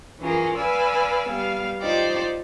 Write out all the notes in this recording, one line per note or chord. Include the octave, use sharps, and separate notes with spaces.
E3 C#4 F4 G#4 A#4
B4 D5 F5 G#5 E6
G3 B3 F5
D#4 F4 G4 C5 D5 D#5